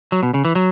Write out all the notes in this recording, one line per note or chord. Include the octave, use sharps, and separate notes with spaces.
F#3
B2
C#3
E3
F#3